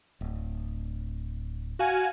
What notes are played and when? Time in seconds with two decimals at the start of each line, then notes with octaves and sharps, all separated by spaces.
0.21 D1
1.79 F#4 F5 G#5